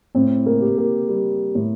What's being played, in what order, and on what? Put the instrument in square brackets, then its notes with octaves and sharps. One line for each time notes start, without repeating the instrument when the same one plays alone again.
[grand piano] A2 [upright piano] C4
[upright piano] A#3
[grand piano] G4
[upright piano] A#3
[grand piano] G3
A2